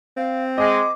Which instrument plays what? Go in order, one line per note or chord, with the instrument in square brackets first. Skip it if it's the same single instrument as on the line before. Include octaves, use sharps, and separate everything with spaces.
[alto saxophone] C4 [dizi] F5
[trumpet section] G#3 [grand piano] D#5 [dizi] D6